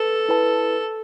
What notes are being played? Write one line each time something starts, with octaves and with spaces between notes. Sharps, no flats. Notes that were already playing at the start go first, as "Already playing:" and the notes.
Already playing: A4 B4 A5
E4 B4 A5